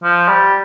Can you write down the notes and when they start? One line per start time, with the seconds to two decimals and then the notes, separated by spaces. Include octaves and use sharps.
0.03 F3
0.28 G3